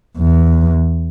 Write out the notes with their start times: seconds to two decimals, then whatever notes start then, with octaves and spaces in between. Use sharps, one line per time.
0.18 E2